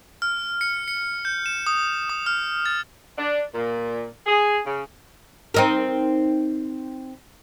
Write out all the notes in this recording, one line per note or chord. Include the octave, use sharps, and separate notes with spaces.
F6
C#7
C#7
G6
E7
D#6
D#6
F6
A6
D4
A#2
G#4
C#3
C4 D#4 A#4